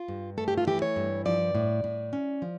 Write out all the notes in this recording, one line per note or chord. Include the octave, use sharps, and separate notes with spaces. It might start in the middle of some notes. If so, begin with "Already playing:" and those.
Already playing: F4
G2
A3 A4
G4
F4
E3 G4
C#5
G2
F3 D5
A2
A2
C#4
F3